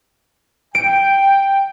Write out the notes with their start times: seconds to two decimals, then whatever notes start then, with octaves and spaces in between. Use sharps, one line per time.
0.75 G5 D7